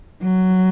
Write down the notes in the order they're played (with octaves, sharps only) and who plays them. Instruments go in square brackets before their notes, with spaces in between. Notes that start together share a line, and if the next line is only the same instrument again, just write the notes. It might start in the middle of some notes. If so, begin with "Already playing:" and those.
[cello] F#3